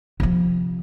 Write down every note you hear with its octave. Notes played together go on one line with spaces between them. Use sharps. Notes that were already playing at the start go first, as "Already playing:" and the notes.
C3 F3